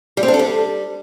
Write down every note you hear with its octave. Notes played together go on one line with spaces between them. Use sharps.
G3
C4
D4
A4
G3